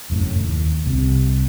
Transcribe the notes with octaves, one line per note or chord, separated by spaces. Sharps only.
F1 F#2 A2
D#2
C2 C3